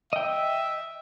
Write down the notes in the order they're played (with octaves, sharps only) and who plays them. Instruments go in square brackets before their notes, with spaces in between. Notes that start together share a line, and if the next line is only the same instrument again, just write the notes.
[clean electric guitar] D#5 G5 [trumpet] E5